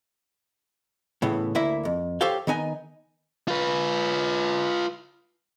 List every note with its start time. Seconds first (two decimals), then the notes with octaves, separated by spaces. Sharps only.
1.22 A2 C#3 E3 B3
1.55 D2 A#3 E4 E5
1.85 F2
2.21 G4 A4 C5 C#5 F5 G5
2.47 D#3 B3 D#4 G#5
3.48 F4 B4